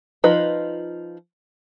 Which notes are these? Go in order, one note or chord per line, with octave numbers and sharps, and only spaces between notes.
F3 D#4 F4 B4 D#5